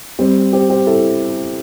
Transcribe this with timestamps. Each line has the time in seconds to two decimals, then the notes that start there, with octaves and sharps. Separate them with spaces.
0.19 G3 C4
0.52 G4 C5
0.69 G4 C5
0.87 E4 A4